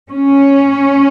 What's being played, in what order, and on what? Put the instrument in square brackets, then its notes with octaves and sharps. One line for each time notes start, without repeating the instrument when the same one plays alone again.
[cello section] C#4